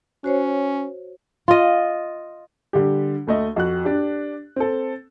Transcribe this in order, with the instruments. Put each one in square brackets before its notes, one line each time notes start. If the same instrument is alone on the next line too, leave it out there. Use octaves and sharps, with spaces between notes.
[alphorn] C#4 [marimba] F#4 C5 C#5
[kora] F4 D#5
[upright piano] D3 G3 G4
D2 A3 D#5
F2 F#4 F#6
D4 G4
C4 A4